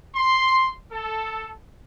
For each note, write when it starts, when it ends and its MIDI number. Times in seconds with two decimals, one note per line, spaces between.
0.15 0.71 84
0.92 1.51 69